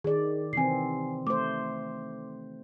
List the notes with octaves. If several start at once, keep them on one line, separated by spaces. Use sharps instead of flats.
D#3 G#4 D5
C3 E3 C4 G#5 C7
A3 C5 D6